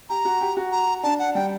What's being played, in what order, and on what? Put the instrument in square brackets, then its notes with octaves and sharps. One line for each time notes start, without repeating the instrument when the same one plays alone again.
[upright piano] G4 [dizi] A#5
[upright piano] F#4
G4
F#4
[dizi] A#5
[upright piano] D4 [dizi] A5
[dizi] F#5
[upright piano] G3 [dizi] G5